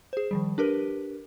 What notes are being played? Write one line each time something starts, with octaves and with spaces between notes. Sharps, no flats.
G#4 C5
D#3 F3 G3
D4 G4 A#4 B4